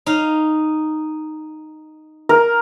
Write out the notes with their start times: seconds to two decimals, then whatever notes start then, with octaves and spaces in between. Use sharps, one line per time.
0.06 D#4 F5
2.29 A#4